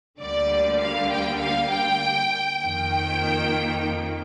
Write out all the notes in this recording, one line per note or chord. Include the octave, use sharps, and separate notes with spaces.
D2 D3 G3 A#3 D5
F5
G5
F5
G5
F2 D#3 A#3 G5